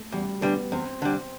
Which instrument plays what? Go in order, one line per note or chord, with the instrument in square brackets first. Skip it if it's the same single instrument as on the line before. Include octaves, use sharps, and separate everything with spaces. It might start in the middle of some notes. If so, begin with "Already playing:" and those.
Already playing: [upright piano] A3
[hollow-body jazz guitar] E2 [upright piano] G3
[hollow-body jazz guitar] D3 G3 [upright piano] B3
[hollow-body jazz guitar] E2 [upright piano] C4
[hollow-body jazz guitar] D3 G3